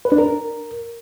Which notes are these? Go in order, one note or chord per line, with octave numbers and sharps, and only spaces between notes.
B4
D4
A#4